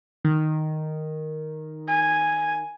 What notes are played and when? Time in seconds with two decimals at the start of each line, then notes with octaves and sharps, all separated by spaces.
0.25 D#3
1.88 G#5